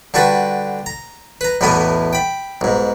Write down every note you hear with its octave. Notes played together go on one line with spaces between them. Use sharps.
D3 G3 F#4 A4 B4
A#5
B4 A#5
B1 E2 A2 E3 B3 D#6
G5 B5
B1 G#2